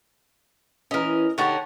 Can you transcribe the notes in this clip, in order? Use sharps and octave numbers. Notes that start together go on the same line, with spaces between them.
E3 C#4 A#4 D#5
D3 D#4 G4 C#5 F#5 A5